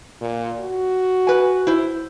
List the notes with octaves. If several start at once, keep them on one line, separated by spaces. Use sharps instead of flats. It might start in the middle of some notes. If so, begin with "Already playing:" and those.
A#2
F#4
B4 G#5
E4 C5